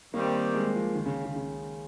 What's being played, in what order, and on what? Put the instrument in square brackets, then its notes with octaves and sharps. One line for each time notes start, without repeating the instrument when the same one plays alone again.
[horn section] D#3 G3 C4 [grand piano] A#3
[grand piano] G#3
F3
D#3
C#3
C#3
C#3